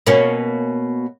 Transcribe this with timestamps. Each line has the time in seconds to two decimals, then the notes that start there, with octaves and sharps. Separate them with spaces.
0.07 B2 A#3 C#4